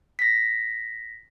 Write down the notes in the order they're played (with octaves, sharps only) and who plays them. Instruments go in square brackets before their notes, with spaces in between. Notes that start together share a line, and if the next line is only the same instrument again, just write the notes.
[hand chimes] A#6 B6